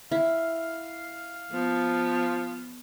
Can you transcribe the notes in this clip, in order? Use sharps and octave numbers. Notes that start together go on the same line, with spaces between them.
E4 F5
F3 B3